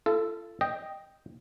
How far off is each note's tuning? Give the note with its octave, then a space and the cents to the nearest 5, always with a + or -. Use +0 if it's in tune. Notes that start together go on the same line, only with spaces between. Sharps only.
F4 -40 A4 +0
D#5 +0 G5 +0